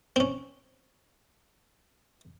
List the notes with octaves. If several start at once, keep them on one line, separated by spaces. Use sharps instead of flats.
C4
C#4